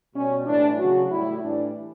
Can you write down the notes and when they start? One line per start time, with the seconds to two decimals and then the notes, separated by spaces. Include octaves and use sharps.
0.15 B2 G3 C#4
0.46 A2 E3 G3 D4
0.78 C#3 F#3 F#4
1.11 A2 G3 E4
1.43 A2 E3 G3 D4